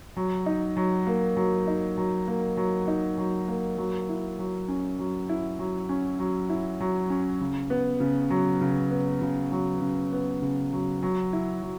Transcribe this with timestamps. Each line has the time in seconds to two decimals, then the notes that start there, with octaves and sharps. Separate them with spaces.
0.17 F#3
0.46 D#4
0.77 F#3
1.07 A#3
1.37 F#3
1.67 D#4
1.98 F#3
2.28 A#3
2.57 F#3
2.88 D#4
3.18 F#3
3.48 A#3
3.78 F#3
4.09 E4
4.39 F#3
4.68 C#4
4.99 F#3
5.29 E4
5.59 F#3
5.89 C#4
6.20 F#3
6.50 E4
6.81 F#3
7.10 C#4
7.41 C#3
7.70 B3
8.00 C#3
8.30 F#3
8.61 C#3
8.91 B3
9.22 C#3
9.52 F#3
9.81 C#3
10.13 B3
10.42 C#3
10.73 F#3
11.03 F#3
11.33 E4
11.62 F#3